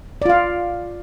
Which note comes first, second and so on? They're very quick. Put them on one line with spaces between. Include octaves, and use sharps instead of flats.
D5 F4 F5